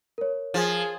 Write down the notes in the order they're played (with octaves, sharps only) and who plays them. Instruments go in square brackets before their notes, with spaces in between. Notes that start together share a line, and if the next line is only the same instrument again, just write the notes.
[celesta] A#4 C#5
[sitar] F3 [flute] G#4